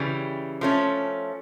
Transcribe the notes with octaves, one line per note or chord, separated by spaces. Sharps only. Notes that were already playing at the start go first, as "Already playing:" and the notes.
Already playing: C#3 E3 G3
F3 A3 C#4